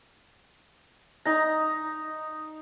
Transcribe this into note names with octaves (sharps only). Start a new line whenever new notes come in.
D#4 A#5